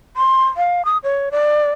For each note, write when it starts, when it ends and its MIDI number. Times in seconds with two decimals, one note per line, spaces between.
0.17 0.45 84
0.57 0.85 77
0.85 0.98 87
1.03 1.29 73
1.31 1.72 74